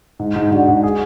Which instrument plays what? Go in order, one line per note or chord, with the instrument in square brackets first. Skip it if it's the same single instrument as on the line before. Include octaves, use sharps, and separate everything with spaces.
[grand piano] G#2
G#2
[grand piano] G#2 [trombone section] D4 F#4
[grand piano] G#2
G#4